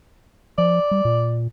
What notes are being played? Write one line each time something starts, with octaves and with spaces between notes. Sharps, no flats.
F3 D5
G3
A#2